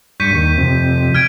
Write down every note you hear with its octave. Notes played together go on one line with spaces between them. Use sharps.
G2 C#6 G6 B6 D#7
D#2
F2 C3
F6 G#6 D7